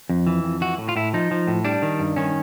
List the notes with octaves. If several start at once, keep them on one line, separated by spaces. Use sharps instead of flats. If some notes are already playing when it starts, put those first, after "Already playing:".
F2
E3
F2
E3 F#4
A2
F4
A2 E4
F3 D#4
F3
A2
G3 D4
D#3
G2
D#3 C#4